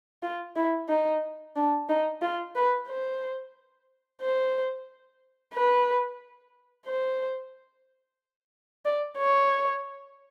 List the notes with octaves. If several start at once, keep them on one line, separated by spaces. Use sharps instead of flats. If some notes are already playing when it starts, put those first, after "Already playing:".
F4
E4
D#4
D4
D#4
F4
B4
C5
C5
B4
C5
D5
C#5